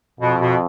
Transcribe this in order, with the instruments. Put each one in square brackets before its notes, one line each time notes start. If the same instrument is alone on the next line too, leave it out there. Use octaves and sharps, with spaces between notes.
[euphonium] F2 [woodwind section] B2
[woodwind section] B2